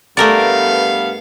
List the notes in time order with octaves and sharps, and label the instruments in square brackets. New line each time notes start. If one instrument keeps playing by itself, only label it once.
[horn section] G2 B3 F5 [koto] A3 A#4 D5